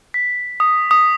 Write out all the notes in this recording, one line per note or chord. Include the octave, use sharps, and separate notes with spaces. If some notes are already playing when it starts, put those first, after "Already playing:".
B6
D#6
D#6